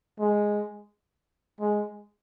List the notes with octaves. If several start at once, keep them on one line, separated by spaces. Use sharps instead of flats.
G#3
G#3